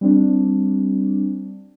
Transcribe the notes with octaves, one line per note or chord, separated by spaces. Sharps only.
G3 C4 D4